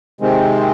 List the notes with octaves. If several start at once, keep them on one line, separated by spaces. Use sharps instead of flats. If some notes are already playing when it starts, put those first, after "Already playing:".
C3 D#3 G#3 C4